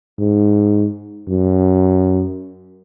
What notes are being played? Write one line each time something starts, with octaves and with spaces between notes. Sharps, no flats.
G#2
F#2